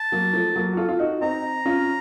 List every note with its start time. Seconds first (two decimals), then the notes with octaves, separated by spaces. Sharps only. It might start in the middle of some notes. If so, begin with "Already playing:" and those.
Already playing: A5
0.12 F#3 A#3
0.34 F3 A3
0.56 F#3 A#3
0.73 F#4
0.77 F4 A4
0.89 F4
0.99 D#4 F#4
1.21 C4 D#4 A#5
1.66 C#4 F4